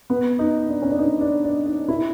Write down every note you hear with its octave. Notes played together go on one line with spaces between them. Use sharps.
B3
D#4
D4
C#4
D4
D#4
D4
D4
D#4
E4